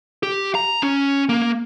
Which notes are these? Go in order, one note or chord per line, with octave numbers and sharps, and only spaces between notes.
G4
A#5
C#4
A#3